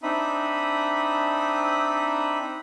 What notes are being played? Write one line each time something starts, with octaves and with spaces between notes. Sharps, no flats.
C4 D4 D#4 E5 B5 D#6